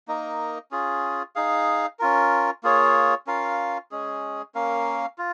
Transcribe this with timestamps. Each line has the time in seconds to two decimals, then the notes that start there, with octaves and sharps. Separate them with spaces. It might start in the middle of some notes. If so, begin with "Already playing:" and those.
0.08 A#3 D#4 A#4 D#5
0.71 C#4 F4 G#4
1.35 D#4 G#4 F5
1.99 C#4 F4 A#4
2.63 A#3 F4 G#4 C#5
3.27 C#4 F4 A#4 F5
3.91 G#3 C#4 G#4
4.54 A#3 C#4 A#4 F5
5.18 F4